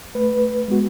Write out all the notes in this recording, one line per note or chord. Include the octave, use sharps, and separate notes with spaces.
A3 B4
G#3 B3 F#4